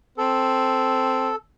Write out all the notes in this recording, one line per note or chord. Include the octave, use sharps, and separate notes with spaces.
C4 A4